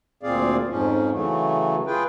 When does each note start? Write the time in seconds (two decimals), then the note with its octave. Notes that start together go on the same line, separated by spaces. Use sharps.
0.23 D2 A#2 C4 G#4 D5 F5
0.69 F2 G#2 F3 C#4
1.10 C#3 E3 F#3 A3
1.87 F4 G#4 B4 G5